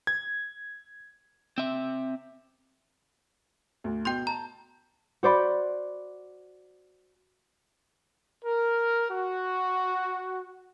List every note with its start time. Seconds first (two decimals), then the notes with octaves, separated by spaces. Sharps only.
0.07 G#6
1.58 C4 E5
3.84 D2
4.05 B2 G5 C6 G6
4.27 A5 A#5
5.23 F#4 C5 D5 B5
8.44 A#4
9.10 F#4